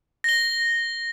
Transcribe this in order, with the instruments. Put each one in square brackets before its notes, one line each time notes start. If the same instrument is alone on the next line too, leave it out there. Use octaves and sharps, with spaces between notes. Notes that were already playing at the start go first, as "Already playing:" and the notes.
[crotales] A#6 G7